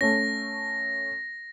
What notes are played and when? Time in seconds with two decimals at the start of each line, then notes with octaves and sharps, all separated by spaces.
0.01 A3 C#4 A#6